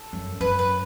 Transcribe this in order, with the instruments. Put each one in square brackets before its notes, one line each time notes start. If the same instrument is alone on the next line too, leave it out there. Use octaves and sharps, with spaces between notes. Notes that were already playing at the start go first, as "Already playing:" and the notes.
Already playing: [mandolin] A4
[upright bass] F#2
[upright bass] F#2 [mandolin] B4
[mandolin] B4